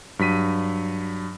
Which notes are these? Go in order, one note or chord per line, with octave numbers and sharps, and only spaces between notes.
G2 F#3 B6 D#7